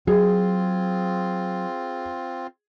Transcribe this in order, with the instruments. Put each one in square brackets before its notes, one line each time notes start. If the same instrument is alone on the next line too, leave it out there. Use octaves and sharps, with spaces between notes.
[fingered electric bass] F#3 [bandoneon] C4 F4 [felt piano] G#4